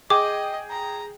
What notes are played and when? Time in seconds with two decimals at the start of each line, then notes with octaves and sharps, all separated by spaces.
0.10 G#4 D#5 G5 D6
0.71 A#5